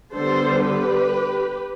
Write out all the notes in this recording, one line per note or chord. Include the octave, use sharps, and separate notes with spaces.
D3 G3 B3 A4 C5
G4 B4